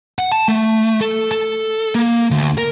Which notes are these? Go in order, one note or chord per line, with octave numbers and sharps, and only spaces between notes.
F#5
A5
A3
A4
A4
A#3
D2
A#4